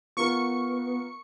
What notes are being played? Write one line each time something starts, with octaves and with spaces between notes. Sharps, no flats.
B3 F4 A#4 C#6 C#7